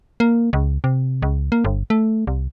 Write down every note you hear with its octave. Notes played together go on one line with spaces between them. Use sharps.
A#3
C#2
C3
C#2
A#3
G1
A3
C2